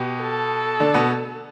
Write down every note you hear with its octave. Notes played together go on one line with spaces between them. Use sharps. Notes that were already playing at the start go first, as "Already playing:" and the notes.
Already playing: B2 B3 G4
A4
D3 D4
B2 B3